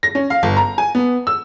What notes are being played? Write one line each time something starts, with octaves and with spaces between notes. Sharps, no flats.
A#6
C#4
F5
G1
A#5
G#5
B3
E6